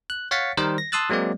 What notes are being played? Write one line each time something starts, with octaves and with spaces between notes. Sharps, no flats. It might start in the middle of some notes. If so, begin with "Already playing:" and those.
F#6
C#5 F5 F#5 A6 B6 C#7
D#3 G3 A#4 C5
A#6
A5 C6 D#6 E6 F#6 A6
F#3 G#3 A#3 C4 D5